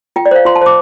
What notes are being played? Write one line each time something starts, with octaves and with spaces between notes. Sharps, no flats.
F4 G5
D5
C5 F5
F4 C6
A5
C5 D6